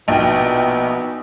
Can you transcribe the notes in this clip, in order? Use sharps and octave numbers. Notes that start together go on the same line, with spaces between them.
A#1 B2 B3 D#4 G5